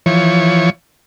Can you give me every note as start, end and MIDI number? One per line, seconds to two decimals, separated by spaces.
0.06 0.70 52
0.06 0.70 53
0.06 0.70 73